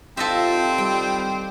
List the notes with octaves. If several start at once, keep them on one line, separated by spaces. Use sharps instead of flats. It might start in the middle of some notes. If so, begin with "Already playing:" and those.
C3 D#3 C4 F4 A4 D#5 E5
G3 G4 D#5 G5